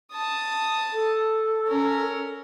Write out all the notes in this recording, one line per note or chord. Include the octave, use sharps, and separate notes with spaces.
A5 D#6
A4
C#4 A#4